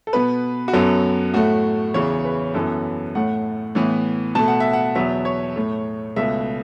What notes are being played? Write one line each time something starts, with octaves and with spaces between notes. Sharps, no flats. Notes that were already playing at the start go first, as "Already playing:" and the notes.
A4
B2 B3 B4
F#4
F#2 F#3 B3 A4
A2 A3 F#4
E2 C#3 E3 C#5
B4
F#2 E3 B3 A4
A2 A3 F#5
A2 E3 B3
B2 A3 A5
F#5
E5
F#5
E2 B2 F#3 B3 E5
C#5
A2 A3
C#2 B2 A3 E5